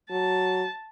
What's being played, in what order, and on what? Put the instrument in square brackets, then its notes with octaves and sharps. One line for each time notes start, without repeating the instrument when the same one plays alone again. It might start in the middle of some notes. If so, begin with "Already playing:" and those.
[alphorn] F#3 [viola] A5